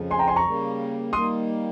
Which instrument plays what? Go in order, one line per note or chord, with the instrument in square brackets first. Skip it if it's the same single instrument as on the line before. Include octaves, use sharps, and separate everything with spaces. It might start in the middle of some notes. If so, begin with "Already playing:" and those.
Already playing: [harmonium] F2 C#3 F3
[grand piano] G#5 C6
G5 A#5
G#5 C6
A#5 C#6
[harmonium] C#3 G3 A#3
[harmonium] D#3 G3 A#3 [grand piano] C6 D#6